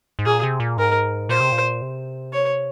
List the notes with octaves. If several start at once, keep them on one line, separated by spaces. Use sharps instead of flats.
G#2
A#2 G#4
C3
A#2
G#2 A#4
A#2 C5
C3
A#2
C3
C#5